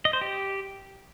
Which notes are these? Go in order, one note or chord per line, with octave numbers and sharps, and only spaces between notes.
D#5
C5
G4